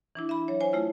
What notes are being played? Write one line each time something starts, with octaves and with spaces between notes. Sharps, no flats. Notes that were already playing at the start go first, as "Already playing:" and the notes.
E3 D4 E4
E5 B5
F#3 C#5
C5 C#5 G#5
A3 E4 F4